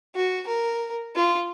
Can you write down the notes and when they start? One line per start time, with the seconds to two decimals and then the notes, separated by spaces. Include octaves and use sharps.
0.15 F#4
0.47 A#4
1.16 F4